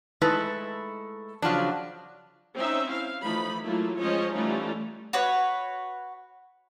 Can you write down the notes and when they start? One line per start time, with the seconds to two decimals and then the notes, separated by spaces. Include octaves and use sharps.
0.21 G#3 A3 D#4 E4 A4 B4
1.42 C#3 F3 F#3 D4
2.54 C4 C#4 D#4 E5
2.88 E4 F5
3.23 E3 F3 A3 D#4 B5
3.63 F#3 A3 A#3 E4 F4
3.98 F3 G#3 C#4 C5 C#5 D#5
4.34 E3 G3 A3 C#4 D#4 F4
5.13 F#4 B4 C#5